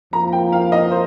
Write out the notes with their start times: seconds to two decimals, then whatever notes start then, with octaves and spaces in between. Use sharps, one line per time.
0.13 F2 F3 A#3 F4 A#4 A#5
0.33 G5
0.52 F5
0.72 D#5
0.91 C5